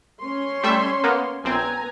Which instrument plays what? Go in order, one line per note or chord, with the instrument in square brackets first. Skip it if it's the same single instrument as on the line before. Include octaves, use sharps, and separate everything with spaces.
[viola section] C#4 C#5 C6
[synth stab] G3 A3 E5
A#3 B3
[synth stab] A#1 C4 [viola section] B3 G#5 A#5